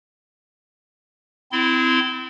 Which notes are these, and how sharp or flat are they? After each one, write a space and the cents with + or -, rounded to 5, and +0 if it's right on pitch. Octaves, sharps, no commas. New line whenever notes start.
C4 -25 E4 +0 C6 -30